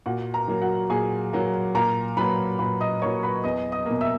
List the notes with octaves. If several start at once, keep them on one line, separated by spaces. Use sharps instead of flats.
A#2 F#4 F#5
A#4 A#5
F#3 A#3
F#4 F#5
A#2 G#4 G#5
F#3 A#3
A#2 A#4 A#5
F#3 A#3 B4 B5
A#2 B4 B5
D#5 D#6
F#3 A#3 C#5 C#6
B4 B5
E2 D#5 D#6
D#5 D#6
B2 A#3
E5 E6